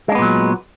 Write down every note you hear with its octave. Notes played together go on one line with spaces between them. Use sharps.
A#2 F#3 G#3 B3 D4